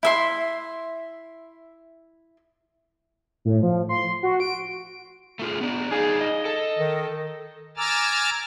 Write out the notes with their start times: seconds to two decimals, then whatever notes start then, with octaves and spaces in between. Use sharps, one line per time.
0.03 E4 E5 C6
3.45 A2
3.63 F3
3.89 C6
4.23 F#4
4.40 D7
5.39 A3 F4 G#4
5.61 B3 D4 D5
5.91 D#4 G#4 D5 F5
6.21 D#5
6.45 A4
6.79 D#3
7.77 G#5 A#5 D6 E6 F6 A6